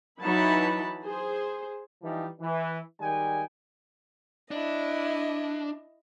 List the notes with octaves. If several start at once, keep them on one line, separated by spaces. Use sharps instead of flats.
E3 F#3 D#4 E4 A5 B5
G#4 C5
E3 F3 G3 D#4
E3
D#3 G3 G#3 G5 G#5
D4 E4 D#5